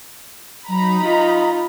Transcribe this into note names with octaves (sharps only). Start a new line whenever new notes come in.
F#3 D#4 A#5 B5
F4 D#5